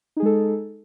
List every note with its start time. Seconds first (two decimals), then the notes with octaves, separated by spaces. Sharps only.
0.17 D#4
0.20 G#4
0.23 G#3
0.26 A4